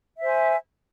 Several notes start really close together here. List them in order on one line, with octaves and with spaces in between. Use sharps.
E5 C5 G#5